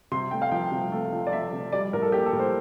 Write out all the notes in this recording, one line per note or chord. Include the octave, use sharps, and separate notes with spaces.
C3 C6
A3 G5
F5
F3 G5
C3
A3
F3
D5
A3 E5
C3
G3 D5
A2 A#4
A4
A#3 G4
A4
A2
C5